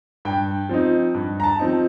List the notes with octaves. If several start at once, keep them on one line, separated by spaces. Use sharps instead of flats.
G2 G5
F3 C4 D#4
G2
A#5
A5
F3 C4 D#4